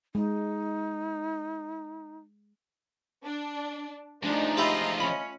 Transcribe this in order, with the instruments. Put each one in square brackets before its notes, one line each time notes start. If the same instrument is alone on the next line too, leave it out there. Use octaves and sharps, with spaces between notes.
[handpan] G#3 [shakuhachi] D#4
[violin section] D4
[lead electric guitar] F3 G#3 [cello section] A3 D#4 [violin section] D4
[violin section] F4 D#5 [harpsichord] G4 E5 B5
[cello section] C#4 [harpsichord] B5